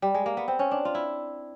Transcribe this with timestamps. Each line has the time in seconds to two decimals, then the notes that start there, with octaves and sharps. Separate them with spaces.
0.02 G3
0.15 G#3
0.26 A#3
0.37 B3
0.48 C4
0.59 C#4
0.71 D4
0.85 F4
0.95 E4